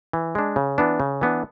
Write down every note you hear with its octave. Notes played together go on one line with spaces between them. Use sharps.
E3
G#3 D4
C#3
E3 B3 D4
C#3
E3 B3 D4